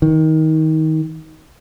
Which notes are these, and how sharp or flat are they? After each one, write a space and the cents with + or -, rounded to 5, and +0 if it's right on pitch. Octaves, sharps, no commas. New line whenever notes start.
D#3 +20